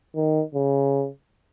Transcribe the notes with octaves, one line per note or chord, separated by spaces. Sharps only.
D#3
C#3